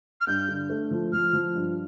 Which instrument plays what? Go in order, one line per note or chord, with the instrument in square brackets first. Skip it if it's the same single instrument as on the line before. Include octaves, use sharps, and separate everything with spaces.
[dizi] F6
[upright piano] G2 [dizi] G6
[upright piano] D3
A3
F3
[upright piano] F3 [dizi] F6
[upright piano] F3
G2